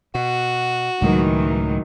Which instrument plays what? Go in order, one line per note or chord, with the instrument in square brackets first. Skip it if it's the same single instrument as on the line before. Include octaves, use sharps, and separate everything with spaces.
[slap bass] B2 [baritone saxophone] F#4
[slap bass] C#2 A2 G#3 [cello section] D#3 E3 F#3